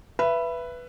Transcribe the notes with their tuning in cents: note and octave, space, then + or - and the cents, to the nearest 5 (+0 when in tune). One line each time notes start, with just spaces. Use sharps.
B4 +0 E5 +25